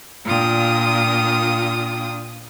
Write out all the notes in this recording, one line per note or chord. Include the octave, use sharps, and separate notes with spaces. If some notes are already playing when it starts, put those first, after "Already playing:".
A#2 D4 F4 G5 D#6